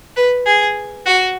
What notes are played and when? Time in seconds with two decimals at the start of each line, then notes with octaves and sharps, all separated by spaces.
0.16 B4
0.46 G#4
1.06 F#4